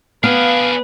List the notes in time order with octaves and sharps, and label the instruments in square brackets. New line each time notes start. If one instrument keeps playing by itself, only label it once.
[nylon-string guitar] B3 [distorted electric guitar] D4 G#4 [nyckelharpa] B4 [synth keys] F5